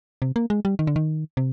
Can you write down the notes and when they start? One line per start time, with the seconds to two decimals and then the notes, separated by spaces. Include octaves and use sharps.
0.22 C3
0.36 A#3
0.50 G#3
0.65 G3
0.79 D#3
0.87 D3
0.96 D#3
1.37 C3